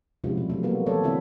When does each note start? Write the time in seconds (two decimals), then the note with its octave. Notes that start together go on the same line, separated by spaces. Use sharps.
0.24 C3 F3 G#3 C#4 E4 F#4
0.37 B2 G3
0.49 F#3 A3
0.63 G3 A#3 B3 F#4
0.86 E3 A3 B3 A4 C#5 D5
1.03 D3 E3 C4 E4 F#4 E5